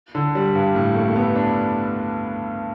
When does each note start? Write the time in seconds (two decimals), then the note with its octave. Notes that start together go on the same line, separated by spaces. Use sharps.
0.15 D3
0.35 G3
0.55 G2
0.75 A2
0.95 A3
1.08 A3
1.15 B3
1.36 D4